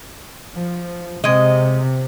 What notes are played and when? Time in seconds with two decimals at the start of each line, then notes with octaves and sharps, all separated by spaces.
0.52 F3
1.24 C3 G#3 D#5